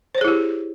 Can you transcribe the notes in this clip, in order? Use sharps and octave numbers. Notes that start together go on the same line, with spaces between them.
E4 G4 G#4 C5 C#5